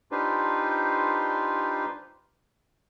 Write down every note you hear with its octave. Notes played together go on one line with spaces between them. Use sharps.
D4 D#4 F4 G4 B4 C5